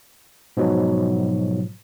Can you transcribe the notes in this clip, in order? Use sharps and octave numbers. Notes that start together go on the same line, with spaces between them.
G#2 B2 F3 F#3